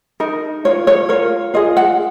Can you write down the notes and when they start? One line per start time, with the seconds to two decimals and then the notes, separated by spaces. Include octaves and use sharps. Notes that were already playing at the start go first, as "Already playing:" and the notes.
0.20 D#4 A#4
0.65 F4 A#4 C#5
0.87 C#5
1.09 F4 A#4 C#5
1.54 F4 G#4 D#5
1.77 F#5